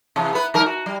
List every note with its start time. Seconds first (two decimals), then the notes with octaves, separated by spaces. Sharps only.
0.16 C3 E3
0.33 B3 B4
0.54 D#3 G3 A#4
0.66 F#4
0.86 G3